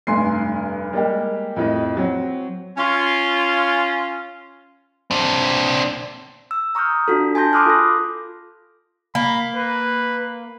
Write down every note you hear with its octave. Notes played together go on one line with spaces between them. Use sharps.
F1 G2 G#5 C6 C7
G3 G#3 A#3 G4
F2 A2 D#5
F#3 C4
C#4 F4
C4 D4
E6
A#5 C#6 D#6 F6 G6
D4 F4 F#4 A4
G#5 A5 C6 G6 A#6
B5 C6 D6 D#6 F6 F#6
F4 A4 A#6
A#3 B5
B4